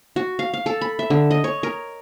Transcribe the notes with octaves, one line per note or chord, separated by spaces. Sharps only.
F#4
F5
F5
A4
B5
E5
D3
D#5
C#5
A#4